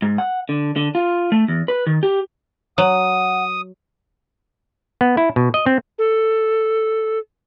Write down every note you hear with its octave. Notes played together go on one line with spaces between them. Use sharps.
G#2
F#5
D3
D3
F4
A3
E2
B4
D#3
G4
F#3 F#5 D#6
B3
E4
B2
D#5
C4
A4